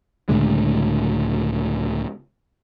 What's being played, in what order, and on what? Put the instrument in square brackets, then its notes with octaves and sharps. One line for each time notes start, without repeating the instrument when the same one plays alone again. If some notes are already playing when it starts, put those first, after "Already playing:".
[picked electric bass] C#2 A2 D3 G#3